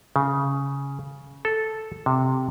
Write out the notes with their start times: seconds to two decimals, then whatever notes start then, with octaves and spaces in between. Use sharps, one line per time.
0.16 C#3
1.45 A4
2.06 C3